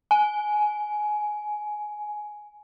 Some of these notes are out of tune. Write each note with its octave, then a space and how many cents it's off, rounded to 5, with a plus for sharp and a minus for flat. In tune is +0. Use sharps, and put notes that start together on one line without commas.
G#5 +15